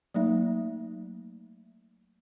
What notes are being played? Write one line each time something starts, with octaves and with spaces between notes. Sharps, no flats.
F#3 A3 A#3 D#4 E5